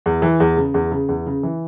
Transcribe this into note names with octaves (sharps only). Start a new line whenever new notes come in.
E2
E3
E2
C#3
E2
C#3
E2
C#3
E3